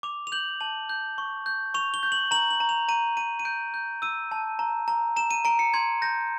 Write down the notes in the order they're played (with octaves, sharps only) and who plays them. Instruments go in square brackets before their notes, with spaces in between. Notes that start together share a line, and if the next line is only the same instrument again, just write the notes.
[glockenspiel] D6 F7
F7
G6 F#7
A5 F#7
G6
C#6
G6
C#6 F7
G7
G6
F#7
A#5 F#7
F#7
A#5
F7
A#5 D#7
A#5 D#7
D#7
G6 D7
G6
E6 D#7
A5
A#5
A#5
A#5 E7
D#7
A#5 D7
C#7
C6 G#6
G6 A#6